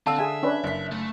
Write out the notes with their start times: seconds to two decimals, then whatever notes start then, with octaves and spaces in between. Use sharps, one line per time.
0.07 D3 C4 F5 A5 E6
0.19 G#4 E5 G#5
0.43 C#4 D4 B4
0.64 F#1 B6
0.92 A3